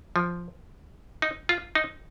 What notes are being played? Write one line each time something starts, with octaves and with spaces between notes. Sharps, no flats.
F3
D#4
F4
D#4